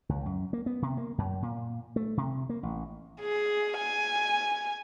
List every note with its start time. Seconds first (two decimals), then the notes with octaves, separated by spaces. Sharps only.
0.09 C#2
0.26 F#2
0.53 A#3
0.66 B3
0.82 C3
0.97 A#3
1.18 F#2
1.42 A#2
1.96 A3
2.17 C3
2.49 A#3
2.63 A1
3.21 G#4
3.78 G#5